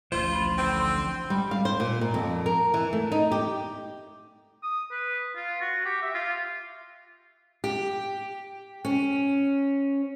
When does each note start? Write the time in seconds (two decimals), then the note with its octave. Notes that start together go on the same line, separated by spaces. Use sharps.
0.12 A1 D2 F3 F4 C5 C6
0.32 B5
0.58 D3 C4 G5 E6
1.30 G3
1.51 F5
1.65 C5
1.80 A#2
2.01 A#2
2.14 F2
2.46 A#4
2.74 E3
2.93 A3
3.12 D#4
3.32 G4
4.63 D#6
4.91 B4
5.36 F4
5.61 F#4
5.85 G4
6.02 E5
6.14 F4
7.64 G4
8.85 C#4